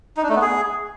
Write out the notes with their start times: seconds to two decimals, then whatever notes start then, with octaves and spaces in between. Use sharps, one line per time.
0.17 D#4
0.23 D4
0.29 A3
0.35 B3
0.42 G#4